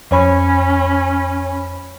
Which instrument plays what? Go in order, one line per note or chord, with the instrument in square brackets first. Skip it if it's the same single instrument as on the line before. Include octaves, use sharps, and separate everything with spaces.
[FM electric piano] F2 C#5 B5 [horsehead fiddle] C#4